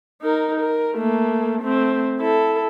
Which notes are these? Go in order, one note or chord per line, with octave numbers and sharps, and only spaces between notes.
D#4 A#4
A#4
A3 A#3
A3 C4
E4 A4